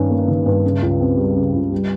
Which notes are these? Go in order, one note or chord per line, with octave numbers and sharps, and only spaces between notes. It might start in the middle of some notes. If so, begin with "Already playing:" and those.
Already playing: G2 D#3 C#4
A#3
D#3
G2
C#3
C#2
C4
G3
C#3
C#2
G3